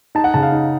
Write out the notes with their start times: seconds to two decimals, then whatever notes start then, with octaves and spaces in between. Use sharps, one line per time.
0.15 D#4 A5
0.24 F#5
0.34 C#3 A5
0.43 F5
0.52 D#4